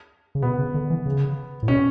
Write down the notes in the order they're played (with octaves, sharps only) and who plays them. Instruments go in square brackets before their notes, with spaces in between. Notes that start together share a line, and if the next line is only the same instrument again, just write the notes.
[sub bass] C#3
[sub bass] B2 [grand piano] B3
[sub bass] C#3
D3
E3
C#3
A2
[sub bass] B2 [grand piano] C#4